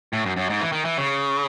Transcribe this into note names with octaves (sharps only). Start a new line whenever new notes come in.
A2
F#2
F#2
G#2
E3
D#3
E3
C#3